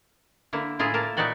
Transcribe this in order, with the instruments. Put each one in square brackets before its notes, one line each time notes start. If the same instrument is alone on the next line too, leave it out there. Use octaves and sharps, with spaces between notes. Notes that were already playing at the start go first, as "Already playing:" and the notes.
[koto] D3 A#3 E4
A2 E4 F4 G#4 A#4
A#3 A#4 A5
A#2 D#4 E4 F#4 D5 G5